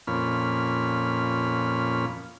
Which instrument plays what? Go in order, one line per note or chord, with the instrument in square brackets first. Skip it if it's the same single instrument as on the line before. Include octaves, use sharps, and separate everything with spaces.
[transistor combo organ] F2 A#2 C#4 B5 F6